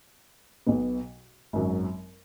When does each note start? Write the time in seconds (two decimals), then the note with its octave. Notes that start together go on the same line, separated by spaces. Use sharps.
0.66 B1 B2 B3
1.53 G#1 F#2 F#3